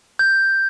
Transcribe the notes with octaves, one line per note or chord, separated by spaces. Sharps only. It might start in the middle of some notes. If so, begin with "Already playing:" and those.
G6